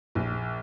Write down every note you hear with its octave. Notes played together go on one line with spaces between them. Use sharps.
A#1